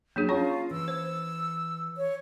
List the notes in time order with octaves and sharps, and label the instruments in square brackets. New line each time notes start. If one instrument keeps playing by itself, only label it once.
[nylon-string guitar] F#3 [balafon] A#3 D4 G#4
[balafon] C#4 C#5 C#6 [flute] F4 [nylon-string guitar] A5
[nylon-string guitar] E3 [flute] E6
[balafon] C5
[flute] C#5